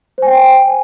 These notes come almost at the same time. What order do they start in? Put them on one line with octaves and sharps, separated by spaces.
C5 G#5 G5